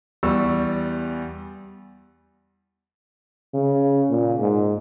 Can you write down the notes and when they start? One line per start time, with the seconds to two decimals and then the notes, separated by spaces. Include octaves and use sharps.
0.23 E2 G3 C#6 E6
3.54 C#3
4.10 A#2
4.40 G#2